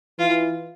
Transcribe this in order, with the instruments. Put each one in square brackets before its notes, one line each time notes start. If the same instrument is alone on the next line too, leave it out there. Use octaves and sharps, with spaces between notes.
[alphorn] E3 [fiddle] F4